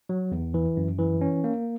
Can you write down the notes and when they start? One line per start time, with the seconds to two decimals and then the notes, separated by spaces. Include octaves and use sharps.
0.09 F#3
0.32 E2
0.54 E3
0.77 F#2
0.98 E3
1.21 C#4
1.44 A#3